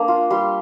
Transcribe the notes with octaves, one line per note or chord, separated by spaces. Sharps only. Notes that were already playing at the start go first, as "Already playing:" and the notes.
Already playing: A#3 D4
F4
G3 C6